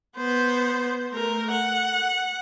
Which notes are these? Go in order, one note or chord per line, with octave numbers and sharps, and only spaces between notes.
B3 C5
A3 A#4
F#5